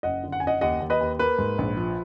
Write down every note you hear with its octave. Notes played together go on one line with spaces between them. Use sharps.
F#1 D#5 F#5
D3
F#5
G#5
F#1 D#5 F#5
D#2 D#5 F#5
D#2
B4 D#5
D#2
A#3 B4
G#2
A#1
F3